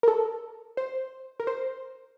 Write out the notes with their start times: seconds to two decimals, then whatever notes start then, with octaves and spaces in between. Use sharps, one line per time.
0.03 A#4
0.08 A4
0.77 C5
1.40 A#4
1.47 C5